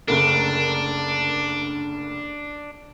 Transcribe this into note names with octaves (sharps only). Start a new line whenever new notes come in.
F#1 D2 D4 A#4